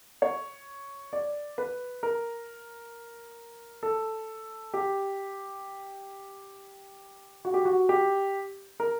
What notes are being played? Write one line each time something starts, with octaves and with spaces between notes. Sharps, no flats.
C#5
D5
B4
A#4
A4
G4
F#4
G4
F#4
G4
A#4